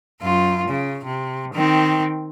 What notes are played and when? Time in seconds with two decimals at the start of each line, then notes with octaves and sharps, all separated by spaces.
0.21 F#2 F4
0.68 C#3
1.05 C3
1.54 D#3 C4